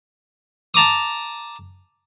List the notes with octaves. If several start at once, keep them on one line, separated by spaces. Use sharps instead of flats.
A5 A#5 D6 D#6